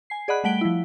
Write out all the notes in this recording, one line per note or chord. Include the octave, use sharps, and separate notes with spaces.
G#5 C7
G#4 D5 D#5 F#5 B5 F#6
G3 A3 F#5 B6 D7 G7
F3 E4